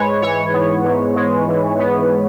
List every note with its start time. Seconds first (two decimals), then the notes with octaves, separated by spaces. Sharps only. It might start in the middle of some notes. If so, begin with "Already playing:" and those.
Already playing: G#2 G#3 B4 C#5
0.22 E3 C#5
0.53 B3
0.84 G#2
1.16 G#3
1.48 E3
1.79 B3